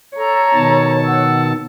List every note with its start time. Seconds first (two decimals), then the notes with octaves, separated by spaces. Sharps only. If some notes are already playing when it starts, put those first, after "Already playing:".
0.17 A4 C#5 A#5
0.55 B2 D#3 A5
1.05 F#5 E6